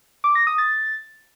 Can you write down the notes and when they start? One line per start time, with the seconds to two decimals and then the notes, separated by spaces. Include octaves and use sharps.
0.24 D6
0.35 A#6
0.47 D#6
0.58 A6